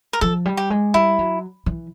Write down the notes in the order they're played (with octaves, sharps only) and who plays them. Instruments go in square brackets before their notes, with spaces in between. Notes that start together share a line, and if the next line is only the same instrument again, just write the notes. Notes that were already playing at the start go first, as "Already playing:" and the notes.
[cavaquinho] A#4
[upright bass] F3 [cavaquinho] A4
[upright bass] G3
[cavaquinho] G4
[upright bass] G#3
[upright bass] G3 [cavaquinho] E4
[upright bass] F#3
E3